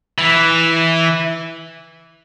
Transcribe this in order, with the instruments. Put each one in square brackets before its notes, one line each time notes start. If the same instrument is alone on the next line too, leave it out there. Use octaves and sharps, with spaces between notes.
[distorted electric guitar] E3